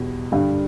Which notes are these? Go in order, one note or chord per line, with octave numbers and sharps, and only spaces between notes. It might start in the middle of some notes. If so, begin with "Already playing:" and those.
Already playing: E2 B2 G3
G2 D3 G3